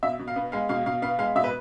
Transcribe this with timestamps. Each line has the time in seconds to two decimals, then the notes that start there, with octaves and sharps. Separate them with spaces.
0.03 B2 E5
0.19 B2
0.28 F5
0.36 B3
0.52 G#3 F5
0.69 B2 F5
0.86 B2 F5
1.02 B3 F5
1.19 G#3 F5
1.35 B2 E5
1.44 B4